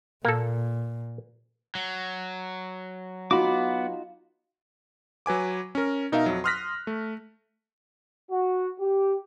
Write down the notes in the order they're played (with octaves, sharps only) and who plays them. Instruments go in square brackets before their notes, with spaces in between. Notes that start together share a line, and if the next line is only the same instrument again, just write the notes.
[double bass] A#2 [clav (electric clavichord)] A#3 A4
[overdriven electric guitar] F#3
[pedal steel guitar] B3 B5 D6 [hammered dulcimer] D#4 F4 [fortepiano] F#4
[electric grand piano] F#3 B4 G#5 D6
C#4 A#4
B2 D#4 A#4 E5 F5
F2 F#3
C6 D#6 F6 F#6 A#6 B6
A3
[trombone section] F#4
G4